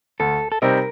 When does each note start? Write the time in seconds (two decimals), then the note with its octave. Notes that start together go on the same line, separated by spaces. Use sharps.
0.20 D2 A4
0.52 A4
0.62 C3 G3 C4 D#4 A#4